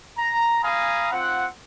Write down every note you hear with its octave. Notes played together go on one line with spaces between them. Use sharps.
A#5
F5 G#5 A#5 B5 D#6
C4 F4 F#5